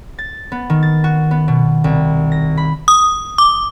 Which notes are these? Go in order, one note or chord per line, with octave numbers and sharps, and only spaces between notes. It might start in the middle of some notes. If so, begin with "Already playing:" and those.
A6
B3
D#3
A6
F#4
B3
B2
C2
A#6
B5
D#6
D6